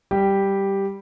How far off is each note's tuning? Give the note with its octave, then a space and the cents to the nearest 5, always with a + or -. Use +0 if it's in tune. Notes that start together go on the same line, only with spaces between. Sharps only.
G3 +0 G4 +0